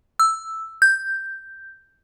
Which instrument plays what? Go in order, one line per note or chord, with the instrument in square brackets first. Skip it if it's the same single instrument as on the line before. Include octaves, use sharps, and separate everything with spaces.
[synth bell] E6
G6